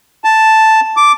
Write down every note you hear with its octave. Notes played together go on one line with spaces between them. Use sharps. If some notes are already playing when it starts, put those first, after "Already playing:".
A5
D6